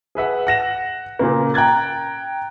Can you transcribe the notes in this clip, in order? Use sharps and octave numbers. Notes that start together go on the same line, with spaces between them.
G#4 B4 E5 F#5
F#5 A#6 E7
A#2 C#3 A#3
G5 A#5 F#6 G#6 A6